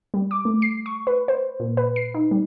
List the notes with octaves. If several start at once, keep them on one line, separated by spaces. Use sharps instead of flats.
G3
D6
A3
C7
C#6
B4
C5
A#2
B4
C7
D#4
G3